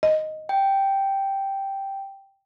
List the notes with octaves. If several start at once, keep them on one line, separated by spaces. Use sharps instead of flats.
D#5
G5